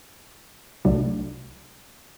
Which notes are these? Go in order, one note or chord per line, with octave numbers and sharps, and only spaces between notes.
C2 C3 F#3 A3 D4